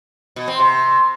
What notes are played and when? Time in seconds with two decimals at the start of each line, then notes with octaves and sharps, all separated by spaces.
0.36 B2
0.48 C4
0.59 C3